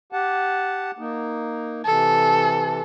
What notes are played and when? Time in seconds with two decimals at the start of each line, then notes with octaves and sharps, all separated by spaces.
0.12 G4 F#5 A5
0.99 A#3 D#4
1.85 C3 E3 A4